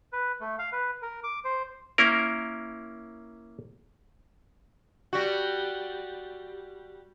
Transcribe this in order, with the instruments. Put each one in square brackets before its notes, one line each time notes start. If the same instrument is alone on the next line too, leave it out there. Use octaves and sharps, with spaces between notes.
[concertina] B4
A3
F5
B4
A#4
D6
C5
[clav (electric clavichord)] A#3 C#4 E4 A#4
[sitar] G3 F#4